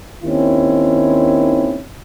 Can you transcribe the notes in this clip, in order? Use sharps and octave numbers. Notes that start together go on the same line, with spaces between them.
D#2 D#3 C4 C#4 E4